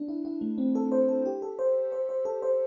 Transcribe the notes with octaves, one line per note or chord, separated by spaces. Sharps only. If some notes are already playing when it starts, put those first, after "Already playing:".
Already playing: D4
E4
E4
A3
C4
A4
C5
A4
G4
A4
C5
C5
C5
A4
C5